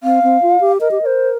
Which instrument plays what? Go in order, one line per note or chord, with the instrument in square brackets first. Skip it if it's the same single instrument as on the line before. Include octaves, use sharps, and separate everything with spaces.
[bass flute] C4 [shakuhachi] F5
[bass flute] C4
F4
G4
[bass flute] A#4 [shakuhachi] D#5
[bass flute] G4
[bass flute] A#4 [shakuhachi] C5